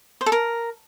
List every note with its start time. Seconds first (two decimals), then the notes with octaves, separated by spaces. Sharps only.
0.21 C5
0.26 A4
0.32 A#4